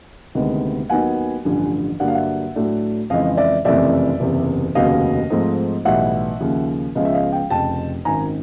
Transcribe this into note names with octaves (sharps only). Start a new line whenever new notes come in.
D2 C3 D#3 G#3 B3
D#2 D#3 F#3 B3 D#4 F#5 G#5
A1 G2 D3 F3
G2 D3 F#3 A#3 D4 F#5
F5
E5 F#5
A2 F#3 A3 D4
F2 C#3 E3 G#3 D#5 F5
D5 E5
F#1 F2 C3 E3 A3 D5 E5
F#1 E2 C3
F1 D#2 C#3 F#3 B3 D#5 F5
G#2 F3 A3 C4 D#4
B1 A2 E3 G3 E5 F#5
D#2 C#3 F3
C#2 C#3 F3 G#3 B3 D#5 F5
E5
D#5 F5
F5 G5
F1 F2 C#3 G5 A5
G#1 F#2 D#3 G#5 A#5